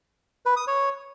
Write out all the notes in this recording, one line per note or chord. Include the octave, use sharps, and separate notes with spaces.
B4
D#6
C#5